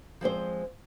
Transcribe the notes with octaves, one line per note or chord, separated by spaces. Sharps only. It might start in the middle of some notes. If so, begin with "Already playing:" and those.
F3 G#3 C4 C5